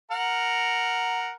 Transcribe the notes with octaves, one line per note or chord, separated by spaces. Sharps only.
A#4 F#5